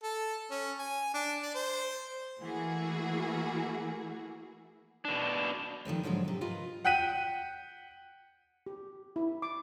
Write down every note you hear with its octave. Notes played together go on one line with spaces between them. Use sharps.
A4
C#4
G#5
D4
D5
C5
E3 A3 A#3 E4 F#4 G#4
B2 D4
D#3 F3 A3 C4
G#2 D3 F3 F#3 G#3
C3 B3
F4 A#4 B4 D#5
F#5 G5 F#6 B6 D#7
G4
E4
D6